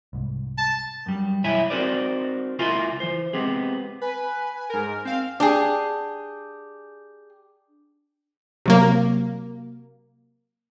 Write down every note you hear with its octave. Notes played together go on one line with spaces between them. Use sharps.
C2 G#2
A5
F#2 G3
B1 E3 E4 C#5 E5 G#5
C4 D#4 F#4 A#4 C5 D5
C#2 E4 F4 A#4 G#5 C6
E3 C5
G#3 B3 C4 G4 G#4
B4 G#5
G#2 A#4
C4 F5
D4 G4 G#4
C3 F#3 A#3